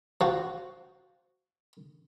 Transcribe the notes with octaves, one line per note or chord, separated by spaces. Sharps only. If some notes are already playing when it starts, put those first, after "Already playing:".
F3 F#4